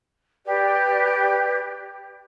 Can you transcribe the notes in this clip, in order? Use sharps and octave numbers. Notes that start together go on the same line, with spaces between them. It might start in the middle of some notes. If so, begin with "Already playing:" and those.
G4 B4 D5